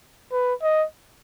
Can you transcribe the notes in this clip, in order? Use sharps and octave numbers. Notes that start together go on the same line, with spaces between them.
B4
D#5